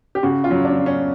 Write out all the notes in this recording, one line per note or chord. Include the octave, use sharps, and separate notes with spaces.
G4
C#3 F#4
F4
F#3
D4
F#3
C#4